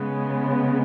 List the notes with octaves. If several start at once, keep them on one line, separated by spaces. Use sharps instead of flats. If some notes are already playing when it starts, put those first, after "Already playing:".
Already playing: C#3 G#3 B3